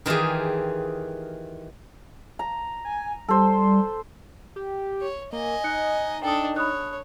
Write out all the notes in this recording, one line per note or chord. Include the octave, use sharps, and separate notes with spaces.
D#3 E3 F4 G4 G#4
A#5
G#5
G3 A4 C5
G4
C#5
A#3 D#5 G#5
D#4 F#6 C#7
D4 A4 G5 D#6
C#5 B5 D#6 F#6